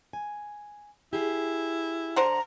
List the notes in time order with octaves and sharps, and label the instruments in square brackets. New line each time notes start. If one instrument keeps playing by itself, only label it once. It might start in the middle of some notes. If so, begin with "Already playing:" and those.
[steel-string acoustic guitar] G#5
[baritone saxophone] E4 [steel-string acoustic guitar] G4 G#4
[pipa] D3 C5 F#5 [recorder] A#5